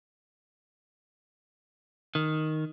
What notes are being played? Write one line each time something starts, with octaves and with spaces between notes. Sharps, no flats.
D#3